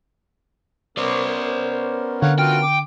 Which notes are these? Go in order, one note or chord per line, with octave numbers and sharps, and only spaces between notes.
B3 C#4 A#4 C5 D5
D3 C#5 F5 F#5
F4 F#4 G5 F6
D6